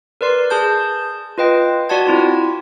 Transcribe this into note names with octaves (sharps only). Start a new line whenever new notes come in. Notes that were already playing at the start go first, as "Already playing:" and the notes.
A#4 B4 D5 C6 C7
G#4 A5 G6
F4 B4 D#5 G5
F#4 D5 F#5 A5 G#6
C4 E4 F4